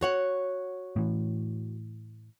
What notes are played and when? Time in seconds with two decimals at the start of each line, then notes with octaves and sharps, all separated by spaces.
0.01 F#4 C#5 F#5
0.96 A2 E3